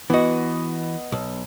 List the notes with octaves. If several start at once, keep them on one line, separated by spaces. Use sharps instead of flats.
E3 B3 F#4 D#5
B1